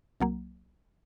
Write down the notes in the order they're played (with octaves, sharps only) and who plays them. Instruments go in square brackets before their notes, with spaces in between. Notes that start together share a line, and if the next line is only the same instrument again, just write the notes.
[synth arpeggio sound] C2 F#3 A#3